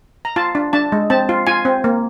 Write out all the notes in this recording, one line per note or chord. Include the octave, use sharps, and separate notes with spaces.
A#5
F4 A5
D4
D4 A5
G#3
C4 A5
F4
F4 G#5
C4
A#3